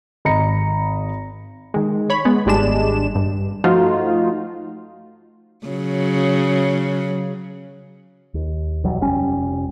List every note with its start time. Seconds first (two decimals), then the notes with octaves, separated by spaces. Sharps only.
0.25 G#1 D#5 A#5 B5 A#6 C#7
1.74 D#3 G#3
2.10 C#5 B5
2.25 G#3 B3
2.46 G#1 G3 G#3 D4 E7
3.15 G2
3.64 F3 A3 D#4 F4 F#4
5.66 C#3 F#3
8.34 D#2
8.84 B1 E2 F#3 G3
9.01 F1 G3 C#4